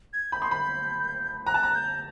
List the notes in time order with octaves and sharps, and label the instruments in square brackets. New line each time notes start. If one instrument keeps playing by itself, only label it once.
[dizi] G#6
[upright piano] B5 [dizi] G6
[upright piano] C6
B5
[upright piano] A#5 [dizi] F#6
[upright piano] A5
A#5
[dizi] G6